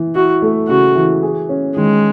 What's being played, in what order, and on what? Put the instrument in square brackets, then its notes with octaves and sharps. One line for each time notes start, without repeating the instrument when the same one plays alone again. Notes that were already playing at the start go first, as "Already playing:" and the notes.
Already playing: [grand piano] E3
[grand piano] E4 [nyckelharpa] F#4
[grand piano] A3
[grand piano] C#3 [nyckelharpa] F#4
[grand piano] E3
G#4
C#4
[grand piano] D#3 [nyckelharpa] G#3